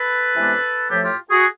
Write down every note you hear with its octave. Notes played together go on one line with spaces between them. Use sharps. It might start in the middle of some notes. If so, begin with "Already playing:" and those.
Already playing: A4 B4
C3 E3 G#3 B3 D4
A2 F3 A3 G4 A4
F4 G4
F#4 G#4